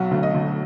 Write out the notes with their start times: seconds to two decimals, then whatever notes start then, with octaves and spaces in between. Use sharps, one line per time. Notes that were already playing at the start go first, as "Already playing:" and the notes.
Already playing: B1 F#3 F#5
0.11 D2
0.23 D#5
0.34 D2